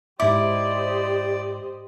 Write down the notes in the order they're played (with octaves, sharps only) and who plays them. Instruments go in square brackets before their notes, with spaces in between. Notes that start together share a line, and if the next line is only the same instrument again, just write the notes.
[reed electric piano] G#2 D6 [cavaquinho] E4 [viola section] G4 C5 D#5 [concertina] D5